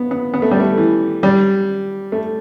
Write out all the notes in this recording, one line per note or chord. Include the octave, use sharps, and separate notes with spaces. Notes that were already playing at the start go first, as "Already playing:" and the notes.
Already playing: B3
B3
B3
A3
G3
A3
E3
G3
A3